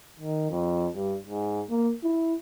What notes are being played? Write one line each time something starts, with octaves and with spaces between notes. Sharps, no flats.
D#3
F2
G2
G#2
A#3
E4